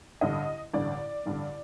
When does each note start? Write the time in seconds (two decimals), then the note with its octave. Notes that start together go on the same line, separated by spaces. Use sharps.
0.21 A1 G2 D3 D#5
0.74 A1 G2 D3 D5
1.26 A1 G2 D3